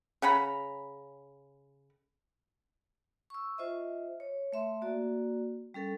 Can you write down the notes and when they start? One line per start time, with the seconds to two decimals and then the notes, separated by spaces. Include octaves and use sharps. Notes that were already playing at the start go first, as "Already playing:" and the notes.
0.22 C#3 F#5 A#5 B5
3.30 C#6 E6
3.58 F4 C5 D#5 E5
4.20 C#5
4.52 A3 E5 C6
4.82 A#3 F#4 D5
5.74 G3 C#4 A4 A#4